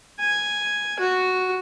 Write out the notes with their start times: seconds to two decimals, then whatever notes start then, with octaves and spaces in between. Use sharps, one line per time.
0.20 G#5
0.99 F#4